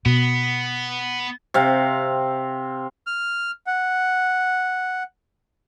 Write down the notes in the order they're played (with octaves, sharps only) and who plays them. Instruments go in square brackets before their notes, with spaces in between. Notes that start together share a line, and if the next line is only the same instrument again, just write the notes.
[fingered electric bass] B2 [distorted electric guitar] B3
[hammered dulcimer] C3 C4 F5
[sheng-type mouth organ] F6
F#5